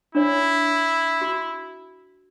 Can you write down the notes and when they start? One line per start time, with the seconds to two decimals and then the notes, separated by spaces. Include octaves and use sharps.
0.15 D4 E4 C#5
1.21 F#4